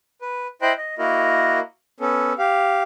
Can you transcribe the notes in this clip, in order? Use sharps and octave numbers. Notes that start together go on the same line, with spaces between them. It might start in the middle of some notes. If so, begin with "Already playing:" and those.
B4
E4 C5 D#5 G5 B5 F#6
D#5
A#3 E4 F#4 A#4 D#5
B3 C#4 A4
G4 F5